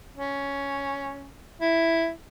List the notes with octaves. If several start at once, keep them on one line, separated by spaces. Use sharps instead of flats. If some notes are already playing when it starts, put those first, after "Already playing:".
C#4
E4